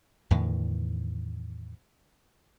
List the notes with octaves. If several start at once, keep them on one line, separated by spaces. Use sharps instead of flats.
E2 A2 D3 D#3